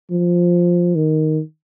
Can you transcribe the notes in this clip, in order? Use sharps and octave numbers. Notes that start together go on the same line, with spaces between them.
F3
D#3